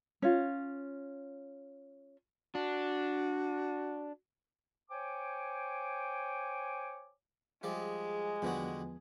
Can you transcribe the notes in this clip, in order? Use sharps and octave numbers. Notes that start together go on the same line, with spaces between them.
C#4 F4
D4 F#4
C5 C#5 G5 G#5 D6
F3 G3 G#3 G#4 D5
E2 D3 F3 G3 B3 F#4